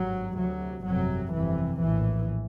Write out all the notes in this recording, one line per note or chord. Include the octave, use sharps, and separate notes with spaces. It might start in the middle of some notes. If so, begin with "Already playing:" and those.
Already playing: G#1 G2 F#3
D2 C3 F#3
G1 F2 C3 F#3
G1 F2 C3 E3
A#1 A2 E3